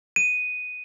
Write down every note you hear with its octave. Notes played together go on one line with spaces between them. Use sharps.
D#7